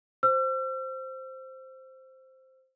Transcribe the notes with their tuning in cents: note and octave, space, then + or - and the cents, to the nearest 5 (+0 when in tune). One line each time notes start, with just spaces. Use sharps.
C5 +0 E6 +40